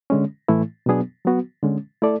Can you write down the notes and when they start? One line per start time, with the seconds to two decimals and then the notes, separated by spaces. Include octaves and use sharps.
0.10 D3 G#3 C#4
0.48 A2 E3 A3 E4
0.86 B2 F#3 B3 D4 G#4
1.25 F#3 B3 F#4
1.63 D3 G#3 C#4
2.02 A3 E4 A4 D5